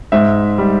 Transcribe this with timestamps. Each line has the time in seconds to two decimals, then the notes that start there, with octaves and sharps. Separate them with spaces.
0.12 G#2 E5
0.58 G3